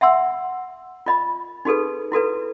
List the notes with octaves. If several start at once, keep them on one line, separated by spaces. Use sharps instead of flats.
E5 F#5 C6 E6
F4 D#5 B5
D#4 F#4 G#4 A4 B4
E4 F#4 A4 B4